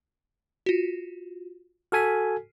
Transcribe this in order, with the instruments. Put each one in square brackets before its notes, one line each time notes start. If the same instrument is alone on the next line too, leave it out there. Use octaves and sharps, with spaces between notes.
[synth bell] F4 F#4
[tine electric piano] F#4 A4 G#5 [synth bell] F6 B6